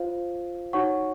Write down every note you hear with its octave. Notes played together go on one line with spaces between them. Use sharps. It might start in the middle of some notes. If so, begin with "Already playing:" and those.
Already playing: F4 C5 F5
D#4 F#4 C#5 F#5 C#6